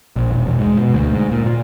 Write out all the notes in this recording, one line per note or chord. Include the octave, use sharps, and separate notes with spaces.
A#1
E1
E1
G#2
B2
D2
G#2
A#2
A#2